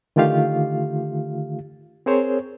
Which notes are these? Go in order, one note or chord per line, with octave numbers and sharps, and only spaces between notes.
D3 D#3 A3 F4 G4 F5
C4 G#4 A#4 C5 C#5